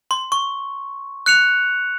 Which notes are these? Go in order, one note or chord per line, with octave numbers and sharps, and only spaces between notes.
C6
C#6
F#6 C#7 F7